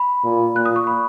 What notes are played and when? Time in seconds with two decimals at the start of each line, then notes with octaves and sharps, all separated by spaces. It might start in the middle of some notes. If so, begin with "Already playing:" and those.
Already playing: B5
0.25 A#2
0.55 A#2 F#6
0.65 D#6
0.76 C#6
0.87 B5